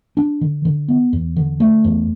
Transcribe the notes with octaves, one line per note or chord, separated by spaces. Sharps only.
D4
D3
D3
B3
E2
D3
A3
E2